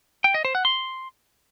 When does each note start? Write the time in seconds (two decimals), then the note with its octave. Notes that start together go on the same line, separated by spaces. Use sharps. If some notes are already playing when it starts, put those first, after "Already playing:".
0.24 G5
0.34 D#5
0.45 C5
0.55 F#5
0.65 C6